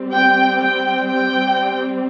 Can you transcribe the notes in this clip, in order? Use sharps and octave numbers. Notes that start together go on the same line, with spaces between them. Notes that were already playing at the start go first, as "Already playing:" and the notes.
Already playing: G3 C4
G5
G5
G5